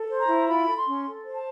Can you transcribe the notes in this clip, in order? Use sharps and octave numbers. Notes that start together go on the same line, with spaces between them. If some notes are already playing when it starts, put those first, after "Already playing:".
Already playing: A4
C5
A#5
E4
F4 B5
A4
C6
C#4
A4
C5
A5